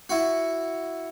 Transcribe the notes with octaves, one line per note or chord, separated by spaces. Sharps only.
E4 F#4